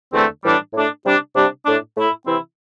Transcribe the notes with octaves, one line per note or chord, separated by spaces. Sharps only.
E2 D3 A3 C4
A2 E3 G3 D4
A2 A3 D4
C3 G3 D4
C3 G3 D4
A2 A3 D4
A2 A3 E4
C3 E3 C4 E4